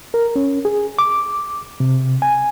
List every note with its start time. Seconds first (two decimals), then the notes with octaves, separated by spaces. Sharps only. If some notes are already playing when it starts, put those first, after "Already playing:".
0.14 A#4
0.36 C#4
0.65 G#4
0.99 D6
1.80 C3
2.22 G#5